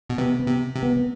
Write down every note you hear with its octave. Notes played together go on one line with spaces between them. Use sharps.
B2
C3 B3
B3
C3
C3
B3
B3